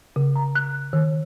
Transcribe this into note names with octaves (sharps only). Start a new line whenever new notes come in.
C#3
A#5
F#6
D#3